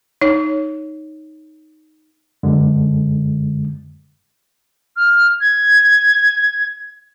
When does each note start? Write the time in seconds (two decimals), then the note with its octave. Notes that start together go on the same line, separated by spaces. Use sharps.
0.21 D#4 C#5
2.43 F#2 D3 G#3
4.96 F6
5.41 G#6